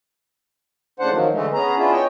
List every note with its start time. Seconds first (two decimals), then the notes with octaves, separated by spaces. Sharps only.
1.00 A2 C#3 D4 C5 F#5
1.12 D#3 F3 F#3
1.32 D3 E3 G#3 A3
1.54 B3 C#4 G#4 A#5
1.78 B3 C#4 D4 E4 F4 G#4
1.92 C#5 D#5 G5